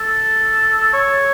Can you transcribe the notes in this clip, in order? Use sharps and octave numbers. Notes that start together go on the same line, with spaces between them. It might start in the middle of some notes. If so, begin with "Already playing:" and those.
Already playing: A4
C#5